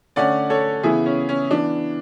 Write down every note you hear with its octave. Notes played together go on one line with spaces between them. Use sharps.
D3 A3 C#4 D5 F#5
A4 C#5
C#3 E3 B3 E4 G#4
C#4
C#4
E3 B3 D4